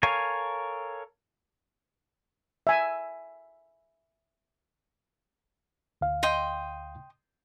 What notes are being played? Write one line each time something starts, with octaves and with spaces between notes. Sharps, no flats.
A4 A#4 C#5 F5 G#5
E5 G#5
D2 F5
D#5 G5 C6